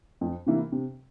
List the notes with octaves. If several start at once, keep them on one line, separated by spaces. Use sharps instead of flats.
F2
C3 E3 A#3 E4
C3